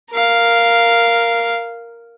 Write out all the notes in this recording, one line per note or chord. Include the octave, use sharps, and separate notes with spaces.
A#4 F5